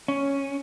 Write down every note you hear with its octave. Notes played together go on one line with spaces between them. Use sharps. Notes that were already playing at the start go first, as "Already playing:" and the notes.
C#4